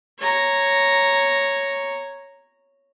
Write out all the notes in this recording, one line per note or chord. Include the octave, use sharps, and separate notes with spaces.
C#5 A#5